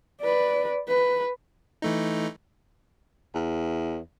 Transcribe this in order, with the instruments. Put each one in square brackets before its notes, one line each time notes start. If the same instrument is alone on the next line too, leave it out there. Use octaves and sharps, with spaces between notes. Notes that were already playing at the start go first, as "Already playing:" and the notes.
[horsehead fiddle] B4 D5
B4
[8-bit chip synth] E3 A3 D#4
[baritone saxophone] E2